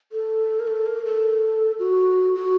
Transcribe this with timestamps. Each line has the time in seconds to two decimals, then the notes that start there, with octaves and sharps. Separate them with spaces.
0.12 A4
0.60 A#4
0.67 A4
0.86 A#4
1.05 A4
1.79 F#4
2.35 F#4